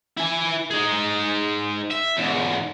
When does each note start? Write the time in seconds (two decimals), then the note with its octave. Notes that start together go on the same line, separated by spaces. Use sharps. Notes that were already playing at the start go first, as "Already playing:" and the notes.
0.17 E4 G#5
0.71 D#4 G#4
1.90 E5
2.17 E2 G#2